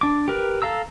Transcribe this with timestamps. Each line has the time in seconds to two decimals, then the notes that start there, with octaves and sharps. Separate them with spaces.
0.01 D4 D6
0.28 G4 A#4 B4
0.62 A4 F5 A#5 E6